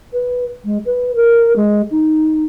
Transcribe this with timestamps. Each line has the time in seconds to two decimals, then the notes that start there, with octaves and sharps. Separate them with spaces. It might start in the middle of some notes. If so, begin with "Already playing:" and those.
0.13 B4
0.65 G#3
0.85 B4
1.15 A#4
1.56 G#3
1.91 D#4